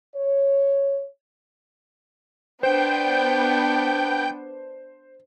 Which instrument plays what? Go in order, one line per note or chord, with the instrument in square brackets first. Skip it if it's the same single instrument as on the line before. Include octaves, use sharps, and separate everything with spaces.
[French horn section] C#5
[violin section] B3 D4 [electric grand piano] C5 [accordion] G5 G6